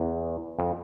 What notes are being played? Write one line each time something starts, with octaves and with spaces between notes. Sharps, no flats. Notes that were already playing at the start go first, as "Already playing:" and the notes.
Already playing: E2
F2